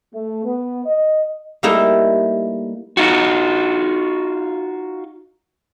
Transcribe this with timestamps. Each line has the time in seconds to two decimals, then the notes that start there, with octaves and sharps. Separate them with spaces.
0.14 A3
0.45 B3
0.86 D#5
1.63 G3 A3 A#3 D#4 E4 G4
2.97 D#4 F4 F#4